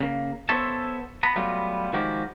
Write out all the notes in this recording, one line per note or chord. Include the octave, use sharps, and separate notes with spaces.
C#3 A#3
B3 A4 C5 C#5 E5 A5
B3 A#5 B5
F#3 G3 A3 B3 F4
D#3 F3 G#3 F#4 G4 A#4